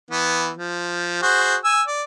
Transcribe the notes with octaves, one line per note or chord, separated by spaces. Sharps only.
E3 B3
F3
F#4 G#4 C5
G#5 E6
D5